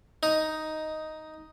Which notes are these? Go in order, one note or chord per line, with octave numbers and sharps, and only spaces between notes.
D#4